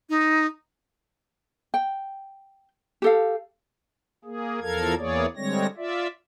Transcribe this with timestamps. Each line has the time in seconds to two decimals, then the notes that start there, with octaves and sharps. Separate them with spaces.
0.09 D#4
1.74 G5
3.02 G4 A4 F5
4.25 A#3 G#4
4.62 E2 F3 A4 A#4 F5 G#6
4.98 E2 E3 A#3 G#4 C#5 D5
5.36 D3 G3 G#3 C4 C#5 A#6
5.77 F4 D5 E5